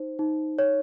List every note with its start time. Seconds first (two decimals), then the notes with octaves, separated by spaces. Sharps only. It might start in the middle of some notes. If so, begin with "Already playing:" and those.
Already playing: D#4 C5
0.19 D#4
0.59 C#5